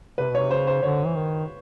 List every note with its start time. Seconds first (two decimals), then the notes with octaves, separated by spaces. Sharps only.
0.18 C3 B4
0.31 B2 C#5
0.40 C3
0.50 C#3 C5
0.67 C5
0.83 D3 C#5
1.06 E3
1.15 D#3